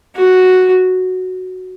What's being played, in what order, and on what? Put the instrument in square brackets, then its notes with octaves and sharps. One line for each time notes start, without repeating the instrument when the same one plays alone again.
[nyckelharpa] F#4